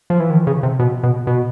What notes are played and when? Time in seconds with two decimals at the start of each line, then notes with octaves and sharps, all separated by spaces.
0.10 F3
0.20 E3
0.30 D#3
0.47 C#3
0.63 C3
0.79 B2
1.03 B2
1.27 B2